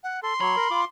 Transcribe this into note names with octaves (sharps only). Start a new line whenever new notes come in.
F#5
A4 C6
F#3 C#5 B5
A#4
F4 D6